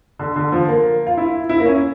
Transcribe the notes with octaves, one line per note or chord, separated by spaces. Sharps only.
D3
D3
F3
A#3
F4
E4
E4
A#3
C#4